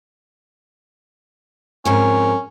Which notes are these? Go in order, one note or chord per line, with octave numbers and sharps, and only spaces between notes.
F2 G#2 C#4 A#4